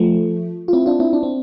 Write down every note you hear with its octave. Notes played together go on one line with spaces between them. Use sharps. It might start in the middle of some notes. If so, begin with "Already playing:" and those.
Already playing: F3 A3
F4
C4 E4
D4 F4
C4 E4
D4
C4